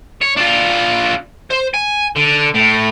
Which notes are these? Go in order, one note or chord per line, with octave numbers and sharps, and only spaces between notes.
C#5
D4 F4
C5
G#5
D3
A2